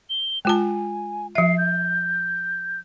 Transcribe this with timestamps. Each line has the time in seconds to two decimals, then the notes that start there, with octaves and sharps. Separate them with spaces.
0.10 G7
0.45 G#3 F4 G#5 A5
1.35 F3 E5 C7
1.58 G6